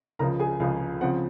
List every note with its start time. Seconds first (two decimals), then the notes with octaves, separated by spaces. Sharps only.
0.19 C#2 C#3 F3 A#4 A#5
0.40 G#4 G#5
0.60 C#2 C#3 F3 F5
1.01 C#3 F3 C4 F#5